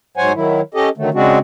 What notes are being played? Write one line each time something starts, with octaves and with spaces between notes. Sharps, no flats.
G#2 F#3 C5 C#5 F#5 G#5
D#3 F#3 E4
C#4 G4 A4 D#5
D3 D#3 F#3 A3
C#3 G#3 C4 D4 F#4